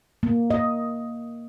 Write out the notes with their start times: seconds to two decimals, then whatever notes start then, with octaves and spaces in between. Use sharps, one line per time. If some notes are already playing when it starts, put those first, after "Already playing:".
0.23 A#3
0.50 D#5